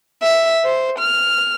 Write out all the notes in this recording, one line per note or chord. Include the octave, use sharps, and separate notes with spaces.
E5
C5
F6